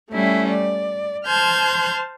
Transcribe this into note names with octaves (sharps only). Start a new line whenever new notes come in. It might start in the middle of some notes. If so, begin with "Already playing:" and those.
G3 A3 C#4 E4
D5
C5 A5 C6 F6 G6 G#6